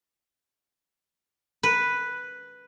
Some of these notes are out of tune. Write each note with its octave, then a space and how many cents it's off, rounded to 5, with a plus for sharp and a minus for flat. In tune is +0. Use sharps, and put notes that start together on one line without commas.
B4 +0